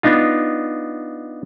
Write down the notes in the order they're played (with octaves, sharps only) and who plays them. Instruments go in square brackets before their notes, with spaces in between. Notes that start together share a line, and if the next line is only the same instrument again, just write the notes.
[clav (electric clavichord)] B3 D4 D#4 F4